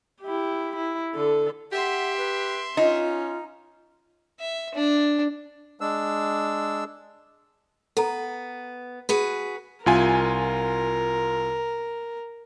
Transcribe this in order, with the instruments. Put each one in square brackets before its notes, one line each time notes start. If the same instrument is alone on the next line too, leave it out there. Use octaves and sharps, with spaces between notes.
[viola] E4 G4
E4
D3 A4
[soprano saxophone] G4 [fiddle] E5 C6 [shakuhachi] F#5
[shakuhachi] B4
[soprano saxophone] C#4 [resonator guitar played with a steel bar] D#4 [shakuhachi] F4
[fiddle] E5
D4
[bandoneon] G#3 D4 E6
[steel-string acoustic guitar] B3 [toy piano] A4 A#5
[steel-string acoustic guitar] F#4 G#4 B4
[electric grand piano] C2 F4 G#5 [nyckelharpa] A#4